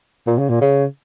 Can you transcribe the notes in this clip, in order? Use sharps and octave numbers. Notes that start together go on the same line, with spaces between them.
A#2
C#3
A#2
C#3